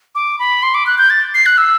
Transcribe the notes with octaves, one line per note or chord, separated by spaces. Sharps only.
D6
B5
C6
D6
F#6
G6
A6
C7
F#6
E6